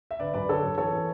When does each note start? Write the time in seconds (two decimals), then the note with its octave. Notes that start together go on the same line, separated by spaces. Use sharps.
0.11 E5
0.20 D3 B4 D5
0.34 F#2 B4 D5
0.49 D3 A4 C#5
0.63 F#2
0.78 E3 A4 C#5
0.93 E3